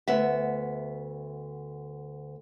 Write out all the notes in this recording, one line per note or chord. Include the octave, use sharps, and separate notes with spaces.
D2 B3 E5